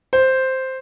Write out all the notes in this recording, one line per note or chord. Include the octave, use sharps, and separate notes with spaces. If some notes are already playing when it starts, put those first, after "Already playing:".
C5